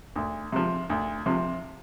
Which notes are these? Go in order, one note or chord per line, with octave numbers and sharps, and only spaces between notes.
D2
C3 F3
D2
C3 F3